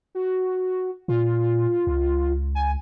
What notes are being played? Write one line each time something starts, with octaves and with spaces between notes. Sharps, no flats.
F#4
A#2 F4
C#2
G#5